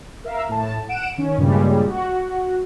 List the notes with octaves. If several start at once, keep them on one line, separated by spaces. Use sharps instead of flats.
A#4 E5 F5
A2 A5
F#5 D7 E7
D#3 C#4
G2 A#2 C#3 G3 G#3
F#4